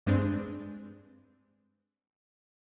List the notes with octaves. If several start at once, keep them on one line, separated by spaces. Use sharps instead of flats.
G2 G#3 C4 D4